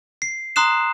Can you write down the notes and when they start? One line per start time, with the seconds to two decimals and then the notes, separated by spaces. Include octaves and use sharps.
0.22 C7
0.56 A#5 C6 D#6 F#6 C7 E7